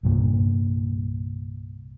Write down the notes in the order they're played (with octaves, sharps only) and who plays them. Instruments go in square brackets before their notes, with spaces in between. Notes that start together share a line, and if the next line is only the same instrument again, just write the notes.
[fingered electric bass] C2 G2 A#2